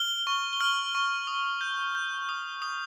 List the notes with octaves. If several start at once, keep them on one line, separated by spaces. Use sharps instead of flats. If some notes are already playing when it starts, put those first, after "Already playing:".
Already playing: F6 G7
C#6
G7
F6 F#7
C#6
D#6
G6
G6
D#6
D#6 F7